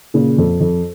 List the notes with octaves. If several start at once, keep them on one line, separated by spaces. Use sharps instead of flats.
A#2 C#3
F2
F2